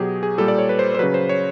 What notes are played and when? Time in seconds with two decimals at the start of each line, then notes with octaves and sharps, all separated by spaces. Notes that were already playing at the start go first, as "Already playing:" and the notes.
Already playing: B2 F#3 G4 G#4
0.23 G#4
0.38 A#2 G3 A4
0.48 D5
0.58 C#5
0.69 B4
0.79 C5
0.95 C5
0.99 C#3 F#3 B4
1.14 C5
1.29 C#5